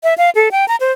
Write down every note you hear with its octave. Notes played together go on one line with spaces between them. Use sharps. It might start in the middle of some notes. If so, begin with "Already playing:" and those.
E5
F5
A4
G5
A#5
C5